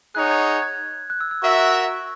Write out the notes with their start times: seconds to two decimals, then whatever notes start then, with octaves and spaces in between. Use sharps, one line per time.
0.15 D#4 G#4 C#5 F#5 F#6
0.31 G#6
0.62 G#6
1.10 F#6
1.21 E6
1.31 E6
1.42 F#4 A#4 E5 C#6
1.58 C#6